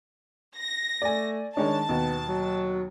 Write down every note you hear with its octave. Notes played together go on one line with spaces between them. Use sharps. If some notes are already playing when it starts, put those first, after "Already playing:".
A#6
A3 D5 G#5
D#3 G#3 D4 C#5 A5
D#2 B2 B3
F#3